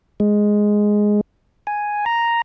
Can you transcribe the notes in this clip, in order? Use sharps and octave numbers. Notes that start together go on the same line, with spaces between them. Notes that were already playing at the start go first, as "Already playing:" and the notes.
G#3
G#5
A#5